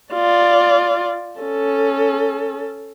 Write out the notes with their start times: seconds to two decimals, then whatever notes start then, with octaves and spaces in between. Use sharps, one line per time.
0.13 F4 D5
1.40 C#4 A4